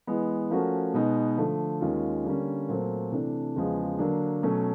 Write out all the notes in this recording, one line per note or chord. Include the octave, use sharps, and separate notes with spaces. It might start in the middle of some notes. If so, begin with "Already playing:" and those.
E3 G#3 B3
F3 A3 C#4 F#4 A#4
B2 G#3 B3 D#4
D3 F3 A3
D#2 D#3 G#3 C#4 F4
D3 G3 A#3 C#4
A#2 F#3 A3 C4
C3 E3 A3 D4
E2 C#3 F3 G#3
D3 F#3 A#3 D4
B2 F#3 A3 C#4